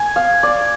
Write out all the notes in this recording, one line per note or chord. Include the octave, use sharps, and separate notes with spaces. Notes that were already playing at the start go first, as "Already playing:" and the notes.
Already playing: G#5
F5
D5